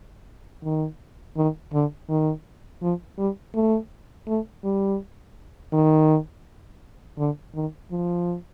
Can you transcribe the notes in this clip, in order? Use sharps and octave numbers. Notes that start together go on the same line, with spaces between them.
D#3
D#3
D3
D#3
F3
G3
A3
A3
G3
D#3
D3
D#3
F3